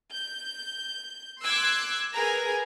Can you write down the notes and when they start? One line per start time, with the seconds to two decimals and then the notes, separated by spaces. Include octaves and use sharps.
0.14 G6
1.42 C6 D6 E6 F#6 G#6
2.14 G#4 A#4 B4 G#5 A#5